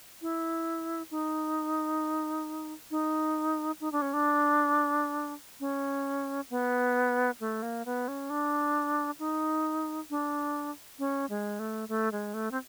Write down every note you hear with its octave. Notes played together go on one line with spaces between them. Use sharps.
E4
D#4
D#4
D#4
D4
C#4
D4
C#4
B3
A3
A#3
B3
C#4
D4
D#4
D4
C#4
G#3
A3
A3
G#3
A3
C4